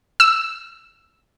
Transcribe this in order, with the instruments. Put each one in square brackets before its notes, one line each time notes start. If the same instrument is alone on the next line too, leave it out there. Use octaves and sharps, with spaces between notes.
[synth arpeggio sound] E6